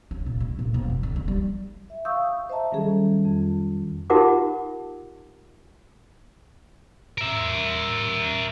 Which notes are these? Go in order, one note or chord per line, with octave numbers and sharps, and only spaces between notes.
C#4
A#2
G#3
A#2
E1
F#2
D3
G#3
G3
E5
F5 C#6 D#6 E6 G6
C5 D#5 E5 A5 A#5
D#3 F#3 G3 C#4 G#4 A4
F2
D#4 F4 G4 A#4 F#5 D6
A#4 E5